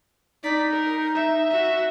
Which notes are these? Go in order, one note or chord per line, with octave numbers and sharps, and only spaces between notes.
D#4 D5 B6
A#4
E5
F#4 E5